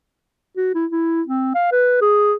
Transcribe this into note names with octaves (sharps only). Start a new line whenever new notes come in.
F#4
E4
E4
C4
F5
B4
G#4